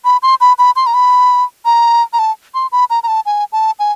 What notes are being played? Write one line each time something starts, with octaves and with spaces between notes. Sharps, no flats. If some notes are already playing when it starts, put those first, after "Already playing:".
B5
C6
B5
B5
C6
A#5
B5
A#5
A#5
A5
C6
B5
A#5
A#5
A5
G#5
A5
G#5